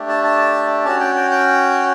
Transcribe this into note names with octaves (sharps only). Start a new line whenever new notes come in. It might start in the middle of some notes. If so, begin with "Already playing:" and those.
Already playing: A3 D4 G4
A5
A5
C#4 F#4 A5
G5
G5
G5